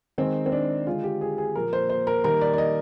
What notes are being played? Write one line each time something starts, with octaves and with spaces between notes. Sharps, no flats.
D#3 G#3 C4
C4
D4
D3 G#3 F4
G4
G#4
G#4
A#2 F3 A#3 A#4
C5
C5
A#4
D#3 G3 A#3 A#4
D5
D5
D#5